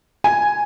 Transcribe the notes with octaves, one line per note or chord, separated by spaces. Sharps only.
G#5